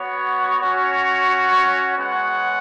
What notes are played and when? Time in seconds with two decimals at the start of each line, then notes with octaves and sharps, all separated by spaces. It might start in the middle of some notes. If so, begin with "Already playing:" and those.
Already playing: B3 F#4 C#5
0.62 C#4 F#4 C#5
1.97 G#3 B3 G#4 C#5 F#5